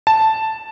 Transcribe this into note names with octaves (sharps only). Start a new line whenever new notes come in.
A5